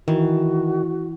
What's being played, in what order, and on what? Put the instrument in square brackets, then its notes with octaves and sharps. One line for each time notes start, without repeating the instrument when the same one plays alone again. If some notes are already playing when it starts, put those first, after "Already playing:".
[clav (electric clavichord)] D#3 [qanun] E3 [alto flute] F#4